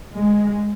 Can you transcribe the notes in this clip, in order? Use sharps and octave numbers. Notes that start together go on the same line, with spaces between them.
D2 G#3